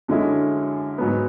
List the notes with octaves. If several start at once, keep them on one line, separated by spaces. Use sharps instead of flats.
F#2 D3 G#3 C#4 E4
G#2 F#3 B3